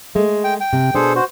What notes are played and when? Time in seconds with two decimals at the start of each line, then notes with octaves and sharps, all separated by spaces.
0.15 G#3 A3
0.44 G5
0.60 G5
0.73 C3
0.95 B2 D4 G#4 A4 C5
1.16 F#4 C5